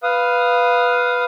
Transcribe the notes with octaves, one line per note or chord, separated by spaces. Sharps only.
B4 F5 D#6